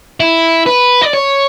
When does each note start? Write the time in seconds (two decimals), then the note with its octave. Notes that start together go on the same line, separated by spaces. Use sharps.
0.20 E4
0.67 B4
1.02 D5
1.13 C#5